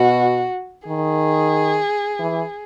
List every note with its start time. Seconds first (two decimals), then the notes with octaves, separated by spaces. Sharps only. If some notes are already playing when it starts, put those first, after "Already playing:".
Already playing: B2 F#4
0.88 D#3 G#4
2.19 E3